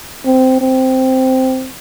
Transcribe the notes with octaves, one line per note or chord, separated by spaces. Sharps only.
C4
C4